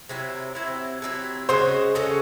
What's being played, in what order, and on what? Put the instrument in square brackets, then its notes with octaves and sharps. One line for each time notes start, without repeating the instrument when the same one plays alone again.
[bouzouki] C3 F#3 C4 E4
C3 F#3 C4 E4
C3 F#3 C4 E4
[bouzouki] C#3 G#3 C#4 F#4 [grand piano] C5
[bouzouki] C#3 G#3 C#4 F#4 [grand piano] A4